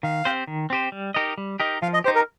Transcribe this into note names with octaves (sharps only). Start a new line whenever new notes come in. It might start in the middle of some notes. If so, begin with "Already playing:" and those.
D#3 F5
C4 G4 C5
D#3
C4 G4 C5
G3
D#4 G4 A#4 D#5
G3
D#4 G4 A#4 D#5
F3 F5
D#5
D#4 G4 C5
A#4